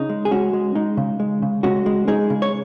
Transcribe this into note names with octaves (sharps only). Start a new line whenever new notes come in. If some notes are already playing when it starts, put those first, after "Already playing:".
Already playing: C#3 D#4
G#3
G#4
G#3 C#4 F#4
G#3
G#3 D#4
C#3
G#3
C#3
G#3 C#4 F#4
G#3
G#3 D#4 G#4
C#3
C#5